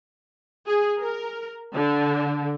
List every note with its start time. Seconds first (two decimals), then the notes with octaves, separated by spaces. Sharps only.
0.66 G#4
0.99 A#4
1.74 D3